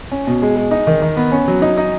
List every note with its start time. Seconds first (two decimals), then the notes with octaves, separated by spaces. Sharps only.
0.12 C#4
0.27 B2
0.42 G#3
0.56 G#3
0.71 D#4
0.87 D#3
1.02 D#3
1.17 B3
1.32 C#4
1.48 F#3
1.62 D#4
1.77 D#4